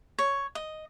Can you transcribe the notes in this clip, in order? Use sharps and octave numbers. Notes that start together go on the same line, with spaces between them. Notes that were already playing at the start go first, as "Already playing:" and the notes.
C#5
D#5